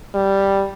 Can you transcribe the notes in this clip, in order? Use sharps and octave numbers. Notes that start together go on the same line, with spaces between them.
G3